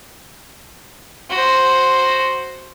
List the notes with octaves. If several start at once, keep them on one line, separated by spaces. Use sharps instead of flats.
F#4 C5